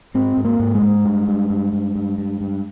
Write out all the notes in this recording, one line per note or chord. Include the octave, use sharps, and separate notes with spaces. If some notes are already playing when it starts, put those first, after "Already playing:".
G#2 C4
G#2
A#3
G#2
G#3
G#2
G2
G2
G2
G2
G2
G2
G2